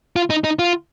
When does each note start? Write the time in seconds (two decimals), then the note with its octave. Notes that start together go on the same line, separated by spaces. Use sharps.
0.16 F4
0.30 D#4
0.44 D#4
0.59 F4